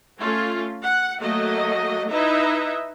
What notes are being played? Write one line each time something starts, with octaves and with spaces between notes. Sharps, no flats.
A3 C#4 F4
F#5
F#3 A3 A#3 F#4 D#5
D#4 E4 B4 D#5 E5